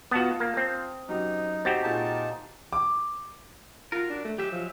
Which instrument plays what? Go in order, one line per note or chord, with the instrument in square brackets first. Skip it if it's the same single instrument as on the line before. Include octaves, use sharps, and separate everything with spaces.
[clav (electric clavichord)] B3 F#4 [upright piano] F4 A5 D#6
[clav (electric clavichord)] A#3
C4
[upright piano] F#2 G4 [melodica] D#4
[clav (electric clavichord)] C4 F#4 G4 [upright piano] A6
[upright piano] A#2 G#4 [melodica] D#4 A5
[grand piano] D6
[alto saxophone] F4 [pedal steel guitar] F#4 A#4
[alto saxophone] D4
A3
[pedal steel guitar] F#3 G#3 E5 [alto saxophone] G4
[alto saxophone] F3